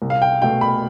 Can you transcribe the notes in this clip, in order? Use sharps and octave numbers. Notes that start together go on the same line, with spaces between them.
C2
F5
G5
B2 A3 G5
B5